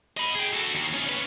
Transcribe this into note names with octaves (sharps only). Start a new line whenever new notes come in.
D#5 B5
G#4 G5
F#4 A4
D#2
C#4 F4
C#4 B4